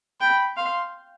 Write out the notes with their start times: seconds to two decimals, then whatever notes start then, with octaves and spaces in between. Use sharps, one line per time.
0.21 G5 B5
0.57 F5 C6